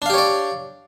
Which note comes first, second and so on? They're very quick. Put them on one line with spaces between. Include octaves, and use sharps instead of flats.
D4 F5 G4 C#5 D5